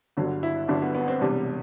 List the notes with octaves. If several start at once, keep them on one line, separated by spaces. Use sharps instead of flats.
G1 G2 D3 F#3
E4
G1 G2 D3 F#3 D4
B3
B3
C4
E1 E2 C3 G3 D4